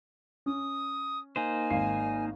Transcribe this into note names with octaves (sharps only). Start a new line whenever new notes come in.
C#4 D#6
A#3 D#4 C5 G#5
G#1 F5 C7